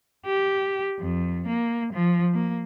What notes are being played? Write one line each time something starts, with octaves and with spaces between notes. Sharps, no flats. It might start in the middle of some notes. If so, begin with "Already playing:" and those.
G4
F2
A#3
F3
A#3